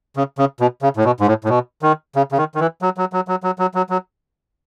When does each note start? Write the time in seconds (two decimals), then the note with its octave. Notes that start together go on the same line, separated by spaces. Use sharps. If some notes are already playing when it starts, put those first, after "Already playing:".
0.17 C#3
0.38 C#3
0.60 B2
0.82 C#3
0.97 A2
1.05 B2
1.20 G#2
1.27 A2
1.44 A2
1.49 B2
1.82 D#3
2.16 C#3
2.32 C#3
2.38 D#3
2.55 D#3
2.60 E3
2.82 F#3
2.97 F#3
3.13 F#3
3.28 F#3
3.43 F#3
3.59 F#3
3.74 F#3
3.90 F#3